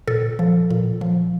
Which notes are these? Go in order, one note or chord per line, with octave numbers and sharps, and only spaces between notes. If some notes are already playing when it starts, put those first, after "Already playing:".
A#2 A4
F3
A#2
F3